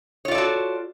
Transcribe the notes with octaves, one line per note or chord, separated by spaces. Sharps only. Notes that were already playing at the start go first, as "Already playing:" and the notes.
F4 F#4 A4 C#5 D5